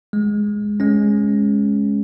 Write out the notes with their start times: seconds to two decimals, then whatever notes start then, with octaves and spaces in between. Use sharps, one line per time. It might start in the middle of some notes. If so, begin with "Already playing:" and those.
0.13 G#3
0.80 G#3 C#4